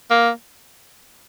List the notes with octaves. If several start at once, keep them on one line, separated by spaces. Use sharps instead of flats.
A#3